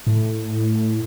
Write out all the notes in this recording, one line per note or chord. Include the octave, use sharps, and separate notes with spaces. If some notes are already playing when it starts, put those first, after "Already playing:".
A2